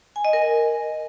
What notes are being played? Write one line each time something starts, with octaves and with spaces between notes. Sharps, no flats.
G#5
D#5
A#4
G#5